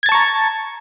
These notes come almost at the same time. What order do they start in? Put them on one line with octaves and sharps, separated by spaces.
G#6 A6 A5 C#6 A#5